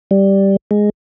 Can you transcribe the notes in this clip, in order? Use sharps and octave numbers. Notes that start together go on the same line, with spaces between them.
G3
G#3